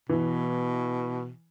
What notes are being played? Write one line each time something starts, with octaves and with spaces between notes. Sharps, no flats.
B2 E3